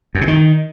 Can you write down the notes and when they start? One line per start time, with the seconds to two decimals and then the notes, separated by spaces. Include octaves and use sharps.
0.15 F#2
0.21 C3
0.28 D#3